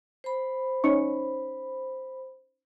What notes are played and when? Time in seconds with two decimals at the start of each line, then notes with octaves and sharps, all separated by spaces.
0.24 C5 B5
0.84 C#4 D#4 C#6